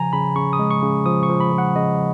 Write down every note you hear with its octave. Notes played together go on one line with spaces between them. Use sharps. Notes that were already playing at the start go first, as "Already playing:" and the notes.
Already playing: C#3 F3 G#5 A#5
C#3 B5
C#3 C#6
D#6
G#3
C#6
C#3
F3 D#6
C#6
F3
B5
F3
F#5
C#3 D#5